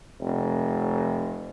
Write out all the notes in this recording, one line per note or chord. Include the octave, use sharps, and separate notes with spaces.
F1